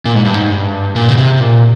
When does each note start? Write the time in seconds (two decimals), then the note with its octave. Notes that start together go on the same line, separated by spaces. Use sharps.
0.05 A#2
0.15 G#2
0.25 G2
0.34 G#2
0.50 G2
0.96 A#2
1.09 C#3
1.17 C3
1.40 A#2